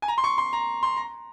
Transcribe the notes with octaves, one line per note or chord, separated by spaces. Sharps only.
G#5
A#5
C6
C#6
C6
A#5
C6
A#5